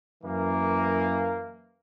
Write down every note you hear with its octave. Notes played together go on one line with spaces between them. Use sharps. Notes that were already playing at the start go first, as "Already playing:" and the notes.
F#2 E3 A#3